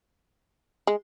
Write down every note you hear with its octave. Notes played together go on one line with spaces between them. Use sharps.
G#3